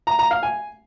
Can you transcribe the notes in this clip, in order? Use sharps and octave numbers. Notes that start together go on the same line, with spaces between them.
A#5
A#5
F5
G#5